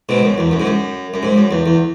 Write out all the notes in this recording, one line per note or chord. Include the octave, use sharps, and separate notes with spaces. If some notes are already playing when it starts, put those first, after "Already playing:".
G#2 B2
F#2
E2
F#2
G#2
F#2
F#2
G#2
F#2
E2
E2